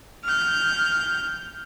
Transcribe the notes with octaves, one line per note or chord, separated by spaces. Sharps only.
F6 G6